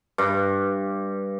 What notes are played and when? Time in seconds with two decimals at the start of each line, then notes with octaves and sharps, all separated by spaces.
0.18 G2